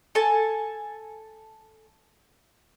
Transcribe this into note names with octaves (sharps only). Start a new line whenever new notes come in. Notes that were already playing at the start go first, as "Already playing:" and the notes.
A4 G#5 A5